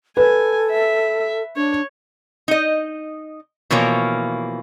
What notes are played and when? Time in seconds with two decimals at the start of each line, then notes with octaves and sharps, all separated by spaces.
0.17 A4 B4 G#5
0.71 E5
1.56 D4 C#5
2.48 D#4 D#5
3.70 B2 E3 F3 A#3 C#5